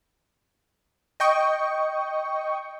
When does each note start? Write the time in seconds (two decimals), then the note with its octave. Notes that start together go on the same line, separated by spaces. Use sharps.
1.20 D#5 G5 C#6